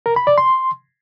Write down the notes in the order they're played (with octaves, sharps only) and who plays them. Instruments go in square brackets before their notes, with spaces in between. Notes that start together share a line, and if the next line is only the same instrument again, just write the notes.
[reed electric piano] A#4
B5
D5
C6